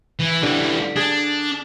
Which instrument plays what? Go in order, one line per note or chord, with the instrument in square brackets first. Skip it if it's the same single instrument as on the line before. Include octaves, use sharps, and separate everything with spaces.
[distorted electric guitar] E3
[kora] D3 [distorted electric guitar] E3 G3
[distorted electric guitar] D4 [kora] G#4